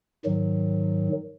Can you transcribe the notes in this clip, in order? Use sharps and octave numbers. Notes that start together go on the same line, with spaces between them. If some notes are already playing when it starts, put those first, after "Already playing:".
G#2 D#3 F#3